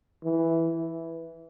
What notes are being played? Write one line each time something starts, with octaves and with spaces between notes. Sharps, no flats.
E3